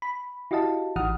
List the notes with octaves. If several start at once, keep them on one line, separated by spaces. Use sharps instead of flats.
B5
E4 F#4 G4 D#5 F5 A5
A1 E3 D#4 F#5 D#6 F6